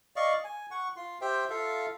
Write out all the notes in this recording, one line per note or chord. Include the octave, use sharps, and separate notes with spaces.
D5 D#5 F5 C#6
G#5
F#5 C#6
F4 C6
G4 C5 E5 G5
F4 A4 E5 F5